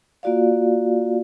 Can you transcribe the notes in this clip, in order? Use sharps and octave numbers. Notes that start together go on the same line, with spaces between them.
A#3 F4 F#4 D5 F5